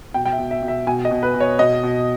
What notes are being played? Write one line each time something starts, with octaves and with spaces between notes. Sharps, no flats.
B2 G5
G5
E5
B2
E5
B2
E5
B2 G#5
D#5
B2
B4
B2
C#5
B2 D#5
B2